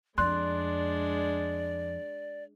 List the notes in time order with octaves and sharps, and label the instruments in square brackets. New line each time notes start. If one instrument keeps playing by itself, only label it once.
[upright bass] F2 [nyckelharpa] G#3 D4 [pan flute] D5 [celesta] C6 F#6